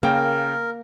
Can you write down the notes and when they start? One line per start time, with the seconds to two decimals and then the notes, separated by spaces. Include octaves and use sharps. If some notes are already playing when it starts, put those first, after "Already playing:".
0.03 C#3 A#3 A#4 G5